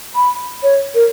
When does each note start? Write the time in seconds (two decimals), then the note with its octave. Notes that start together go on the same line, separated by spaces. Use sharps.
0.15 B5
0.63 C#5
0.95 A#4